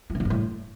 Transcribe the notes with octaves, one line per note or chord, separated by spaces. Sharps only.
F3
C#3
D3
G2
A2